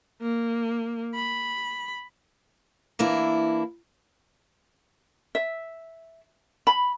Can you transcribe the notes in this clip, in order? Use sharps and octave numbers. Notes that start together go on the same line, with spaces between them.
A#3
B5
E3 A#3 D4 E4
E5
B5